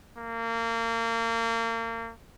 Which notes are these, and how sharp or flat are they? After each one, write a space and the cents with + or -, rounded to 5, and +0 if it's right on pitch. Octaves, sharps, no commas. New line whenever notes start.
A#3 -30